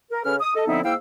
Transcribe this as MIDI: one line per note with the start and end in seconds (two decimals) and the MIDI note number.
0.11 0.23 70
0.24 0.36 49
0.24 0.36 61
0.24 0.36 69
0.24 0.36 71
0.24 0.36 89
0.40 0.55 87
0.56 0.67 69
0.56 0.67 75
0.68 0.81 50
0.68 0.81 53
0.68 0.81 59
0.68 0.81 60
0.68 0.81 63
0.68 0.81 64
0.84 0.93 44
0.84 0.93 58
0.84 0.93 64
0.84 0.93 77
0.84 0.93 79
0.84 0.93 88